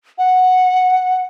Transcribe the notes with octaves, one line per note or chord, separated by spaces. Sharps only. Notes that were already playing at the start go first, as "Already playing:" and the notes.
F#5